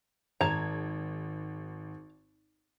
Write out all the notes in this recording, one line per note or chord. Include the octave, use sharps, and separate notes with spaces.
G#1 A5 A#5 G#6